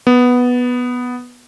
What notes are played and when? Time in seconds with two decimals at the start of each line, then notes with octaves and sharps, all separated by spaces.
0.07 B3